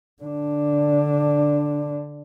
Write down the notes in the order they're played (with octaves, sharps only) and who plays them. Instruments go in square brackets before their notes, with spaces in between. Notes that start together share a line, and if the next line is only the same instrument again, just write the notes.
[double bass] D3 D4